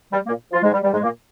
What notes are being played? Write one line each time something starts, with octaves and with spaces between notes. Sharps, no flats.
G3
A#2 A#3
F3 F4
G#2 G#3
G3
G3
G#2 G#3
A#2 A#3